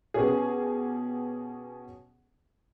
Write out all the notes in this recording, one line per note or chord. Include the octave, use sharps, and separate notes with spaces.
B2 B3 C#4 G4 G#4